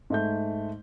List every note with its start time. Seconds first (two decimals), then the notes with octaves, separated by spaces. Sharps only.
0.10 G#2 A3 G6